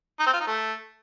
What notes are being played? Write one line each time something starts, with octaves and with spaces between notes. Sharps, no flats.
D#4
C4
F4
D#4
A3